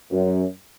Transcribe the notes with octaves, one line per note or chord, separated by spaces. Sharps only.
F#2